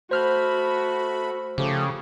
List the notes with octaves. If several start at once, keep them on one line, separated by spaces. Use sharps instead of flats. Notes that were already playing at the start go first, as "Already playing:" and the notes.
A3 F#4 C5 B5 F6 G6
C#3 F3 A3 G4